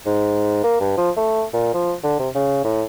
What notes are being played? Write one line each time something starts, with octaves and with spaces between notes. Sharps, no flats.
G#2
A#3
G2
F3
A3
A#2
F3
D3
C3
C#3
A2